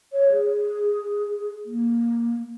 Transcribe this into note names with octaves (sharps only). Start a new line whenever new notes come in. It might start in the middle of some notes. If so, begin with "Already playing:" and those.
C#5
G#4
A#3